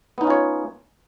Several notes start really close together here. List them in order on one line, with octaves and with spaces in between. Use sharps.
B3 D#4 C#4 F4 C#5